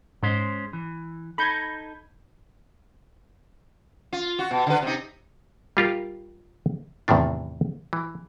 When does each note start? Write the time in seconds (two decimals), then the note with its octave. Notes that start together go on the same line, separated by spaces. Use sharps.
0.23 G#2 G#3 C#4 C5
0.73 E3
1.38 D#4 A4 B5 G6 G#6
4.13 F4
4.39 F#4
4.51 B2
4.67 D3 B4
4.83 C3 D#4
5.77 G3 F4 G4 A#4
7.08 E2 A2 C3 D#3 D4
7.93 E3